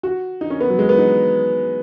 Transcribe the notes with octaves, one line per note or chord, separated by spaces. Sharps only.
F#4
D#4
C#4
B3
F#3
G#3
B3
D#4